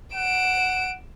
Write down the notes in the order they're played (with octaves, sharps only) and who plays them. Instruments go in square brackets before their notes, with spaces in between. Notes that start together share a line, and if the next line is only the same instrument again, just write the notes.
[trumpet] F#5 [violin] D7 E7